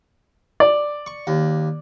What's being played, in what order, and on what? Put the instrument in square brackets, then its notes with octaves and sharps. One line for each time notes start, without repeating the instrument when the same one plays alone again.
[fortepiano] D5
[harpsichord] C#6
D#2